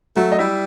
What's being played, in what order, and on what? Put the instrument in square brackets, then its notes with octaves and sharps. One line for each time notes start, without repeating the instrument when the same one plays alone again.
[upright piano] F#3 F#4 [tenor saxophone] A3
[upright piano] D#5
[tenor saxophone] G3 [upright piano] E4 E5